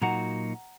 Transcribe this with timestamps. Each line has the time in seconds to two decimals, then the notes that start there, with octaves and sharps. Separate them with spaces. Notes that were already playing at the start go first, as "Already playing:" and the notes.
0.02 A#2 F#3 A#3 D#4 F#4 F#5 A#5